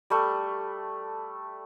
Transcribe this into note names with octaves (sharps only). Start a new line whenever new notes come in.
G3 A3